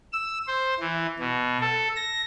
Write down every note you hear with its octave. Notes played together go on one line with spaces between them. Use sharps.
E6
C5
E3
B2
A4
A#6